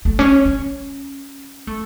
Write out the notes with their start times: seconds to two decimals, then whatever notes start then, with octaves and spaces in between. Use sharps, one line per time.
0.05 A3
0.19 C#4
0.46 C#4
1.67 A3